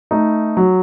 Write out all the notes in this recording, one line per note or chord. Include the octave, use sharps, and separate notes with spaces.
A3 D#4
F#3